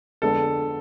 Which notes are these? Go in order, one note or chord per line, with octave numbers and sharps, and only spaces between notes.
F2 D3 G#3 B3 D4 A4